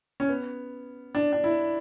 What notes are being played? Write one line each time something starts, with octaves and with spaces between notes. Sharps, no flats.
C#4
B3
D4
D4
E4